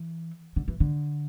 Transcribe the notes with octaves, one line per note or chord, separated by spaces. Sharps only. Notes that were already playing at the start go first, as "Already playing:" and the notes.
Already playing: E3
D3
E3
D3